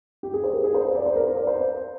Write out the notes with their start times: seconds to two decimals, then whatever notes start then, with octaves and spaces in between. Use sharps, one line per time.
0.23 G4
0.34 G#4
0.44 C5
0.53 A#4
0.64 G#4
0.74 C5
0.85 C5
0.95 D5
1.06 C5
1.16 A#4
1.27 C5
1.36 D5
1.47 C5